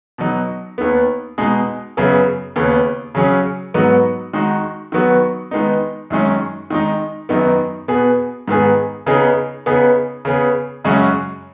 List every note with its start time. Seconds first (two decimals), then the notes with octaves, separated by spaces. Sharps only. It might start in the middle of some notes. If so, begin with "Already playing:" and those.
0.18 B2 F#3 D#4
0.78 D#2 D#3 B3
1.38 B2 G#3 D#4 G#4
1.97 F#2 C#3 B3 G#4
2.56 D#2 C#3 B3
3.15 C#3 F#3 C#4 G#4
3.74 G#2 F#3 B3 D#4 F#4
4.33 D#3 G#3 D#4 F#4
4.92 D#3 F#3 B3 F#4
5.51 D#3 G#3 B3 D#4
6.10 F#2 D#3 G#3 C#4
6.70 D#3 G#3 D#4
7.29 F#2 D#3 B3 D#4
7.88 B2 B3 G#4
8.48 G#2 D#3 B3 G#4
9.06 C#3 B3 D#4 G#4
9.66 C#3 B3 D#4 G#4
10.25 C#3 B3 G#4
10.84 F#2 C#3 G#3 C#4 F#4